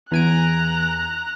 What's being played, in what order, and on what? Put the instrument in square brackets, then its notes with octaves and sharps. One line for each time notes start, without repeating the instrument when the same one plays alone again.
[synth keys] E2 G#5 D7 [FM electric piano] E3 B3 [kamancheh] A#5 F#6